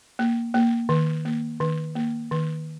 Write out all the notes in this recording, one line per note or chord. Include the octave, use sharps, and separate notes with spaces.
A#3
A#3
D#3
A#3
D#3
A#3
D#3